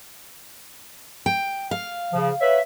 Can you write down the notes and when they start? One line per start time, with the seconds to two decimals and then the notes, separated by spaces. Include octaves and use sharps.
1.26 G5
1.71 F5
2.13 C#3 F3
2.41 B4 C#5 E5